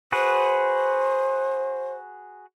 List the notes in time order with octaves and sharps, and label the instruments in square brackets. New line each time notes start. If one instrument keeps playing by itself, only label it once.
[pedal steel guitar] F#4 G#4 B4 [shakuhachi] C5